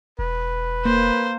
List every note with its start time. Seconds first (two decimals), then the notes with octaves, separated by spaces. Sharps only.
0.19 E1 B4
0.85 A#3 C5